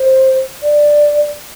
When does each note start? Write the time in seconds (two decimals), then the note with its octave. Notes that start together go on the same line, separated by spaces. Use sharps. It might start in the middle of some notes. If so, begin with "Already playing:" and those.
Already playing: C5
0.62 D5